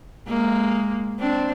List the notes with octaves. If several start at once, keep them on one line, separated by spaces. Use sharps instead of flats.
G#3 A#3
C4 D4